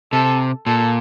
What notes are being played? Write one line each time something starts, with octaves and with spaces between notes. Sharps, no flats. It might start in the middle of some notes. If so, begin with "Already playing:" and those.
C3 A4
A#2 A4